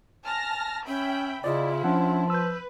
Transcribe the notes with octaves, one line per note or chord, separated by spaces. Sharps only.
G#5 A5 F6 A#6
C#4 E5 G5 B5
C#3 C4 E4 F4 D5 D#5
F3 C#4 D4 F#5
B4 E6 G6